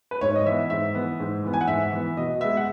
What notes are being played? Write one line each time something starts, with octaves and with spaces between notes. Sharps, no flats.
B4
G#2 C#5
D#5
E3 B3 E5
G#2 E5
E3 B3
G#2
E3 B3
G#5
F#5
G#2 E5
E3 B3
B2 D#5
G#3 B3 E5
F#5